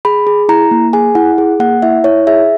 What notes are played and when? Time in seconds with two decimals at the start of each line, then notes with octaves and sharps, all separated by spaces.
0.05 G#4 B5
0.27 G#4
0.49 E4 A#5
0.71 A#3
0.93 G#4 G#5
1.15 E4 F#5
1.38 G#4
1.60 A#3 F#5
1.82 E4 E5
2.04 E4 C#5
2.27 G#4 E5